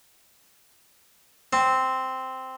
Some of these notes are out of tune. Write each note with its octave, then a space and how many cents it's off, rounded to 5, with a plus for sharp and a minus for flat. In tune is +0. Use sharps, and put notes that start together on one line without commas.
C4 -5